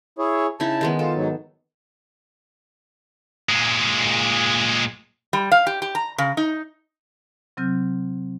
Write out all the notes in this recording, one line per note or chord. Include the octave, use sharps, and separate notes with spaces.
E4 G#4 C#5
C#3 D#4 E4 A5
D#3 G#3 B3
F4 A4
G#2 F#3
A#2 G#3
G3
F5
G4
G4
A#5
C#3
D#4
C3 F#3 C4 F6 G6